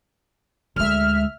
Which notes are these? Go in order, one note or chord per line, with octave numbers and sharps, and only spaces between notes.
D2 G#3 E5 F6